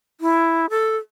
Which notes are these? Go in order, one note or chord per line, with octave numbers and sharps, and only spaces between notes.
E4
A4